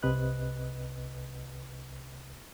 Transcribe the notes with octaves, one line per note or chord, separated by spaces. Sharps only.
C2 C3 B4 D#5 F#6